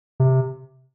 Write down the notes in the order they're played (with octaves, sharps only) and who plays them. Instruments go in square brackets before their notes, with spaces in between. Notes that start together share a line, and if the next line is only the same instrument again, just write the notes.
[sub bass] C3